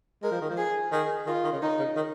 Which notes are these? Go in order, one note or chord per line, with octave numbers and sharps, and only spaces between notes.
G#3 A#4
F3
D#3
F3
G#4
D#3 G#4
D#3 F4
D#3
C#3
D#3 D#4
C#3
D#3